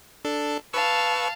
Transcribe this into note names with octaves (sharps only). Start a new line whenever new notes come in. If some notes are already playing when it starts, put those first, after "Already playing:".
D4 A4
B4 F5 A5 C#6 E6